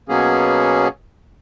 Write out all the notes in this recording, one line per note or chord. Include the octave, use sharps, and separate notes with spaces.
B2 F#3 A#3 B3 C#4 G#4